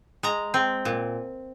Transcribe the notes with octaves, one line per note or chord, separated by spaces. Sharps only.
G#3 A#5
C4
A#2